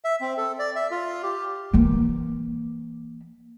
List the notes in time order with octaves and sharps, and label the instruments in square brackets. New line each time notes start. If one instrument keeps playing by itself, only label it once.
[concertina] E5
C4
A4
D5
E5
F4
G4
[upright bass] E3 A#3